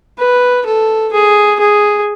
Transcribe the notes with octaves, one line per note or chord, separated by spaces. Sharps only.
B4
A4
G#4
G#4